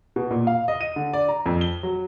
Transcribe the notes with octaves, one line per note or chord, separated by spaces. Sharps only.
B2
A#2
F5
D#5
D#7
D3
D5
A#5
F2
G7
F#3